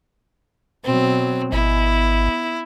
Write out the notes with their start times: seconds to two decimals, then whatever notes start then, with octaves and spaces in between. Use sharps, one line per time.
0.84 B2 F#3 C4
1.53 G#1 B3 E4